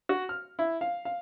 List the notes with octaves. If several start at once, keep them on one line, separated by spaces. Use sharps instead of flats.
F#4
F6
E4
F5
F5